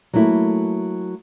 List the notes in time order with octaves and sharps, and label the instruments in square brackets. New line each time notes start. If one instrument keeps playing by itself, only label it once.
[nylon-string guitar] F#3 A3 A#3 E4